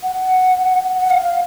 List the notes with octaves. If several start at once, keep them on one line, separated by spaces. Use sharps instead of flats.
F#5
F#5
F5
F5